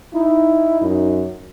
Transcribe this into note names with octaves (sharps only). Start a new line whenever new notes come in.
D#4 E4
F#2